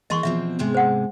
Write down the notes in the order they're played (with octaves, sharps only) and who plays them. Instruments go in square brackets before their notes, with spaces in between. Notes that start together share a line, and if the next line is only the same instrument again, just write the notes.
[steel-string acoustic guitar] E3 A#3 G#4 [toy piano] D#5 C6 C#6
[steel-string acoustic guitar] B2 F3 C4 [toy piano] E5
[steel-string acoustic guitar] G#2 C3 G#3
[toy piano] C5 F#5